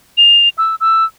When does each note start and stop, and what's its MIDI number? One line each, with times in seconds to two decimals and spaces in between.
0.18 0.49 101
0.58 0.75 88
0.81 1.05 88